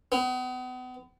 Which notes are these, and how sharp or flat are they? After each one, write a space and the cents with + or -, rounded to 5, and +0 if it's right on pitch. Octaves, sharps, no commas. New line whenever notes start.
B3 +35